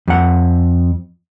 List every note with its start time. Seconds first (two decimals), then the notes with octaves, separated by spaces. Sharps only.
0.08 F2 F#5